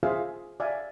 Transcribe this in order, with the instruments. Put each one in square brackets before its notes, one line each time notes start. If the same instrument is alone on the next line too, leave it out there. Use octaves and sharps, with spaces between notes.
[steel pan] F4 G#4 C5 E5 F5 G#5
D5 E5 F5 G#5